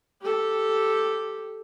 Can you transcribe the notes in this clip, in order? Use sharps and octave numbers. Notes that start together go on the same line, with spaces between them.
G4 A4